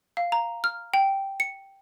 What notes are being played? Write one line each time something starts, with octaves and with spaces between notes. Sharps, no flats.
F5
A#5
F6
G5
C#7